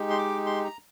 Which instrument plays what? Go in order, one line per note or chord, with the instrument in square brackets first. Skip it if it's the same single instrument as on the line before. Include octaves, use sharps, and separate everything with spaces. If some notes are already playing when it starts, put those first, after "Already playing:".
Already playing: [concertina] G#3 D#4 G4
C6
D6
C6
A#5